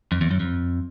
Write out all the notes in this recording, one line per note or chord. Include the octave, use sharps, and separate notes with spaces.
F2
E2
F#2
F2